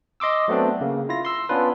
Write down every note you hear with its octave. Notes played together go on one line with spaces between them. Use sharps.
D#5 C6 D6 E6
F#3 A3 B3 C4 D4
C#3 A#3
E4 F4 A#6
C6 E6
B3 C#4 D4 F4 B4